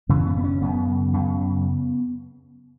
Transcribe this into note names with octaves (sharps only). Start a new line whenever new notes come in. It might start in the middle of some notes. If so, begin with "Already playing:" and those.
F#2 C#3 E3
B3
B3
C#4
F#2 C#3 B3
F#2 C#3